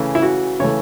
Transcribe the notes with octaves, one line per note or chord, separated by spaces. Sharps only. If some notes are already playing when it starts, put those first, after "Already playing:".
Already playing: C#3 E3 A3
E4
F#4
C#3 E3 A3 C#5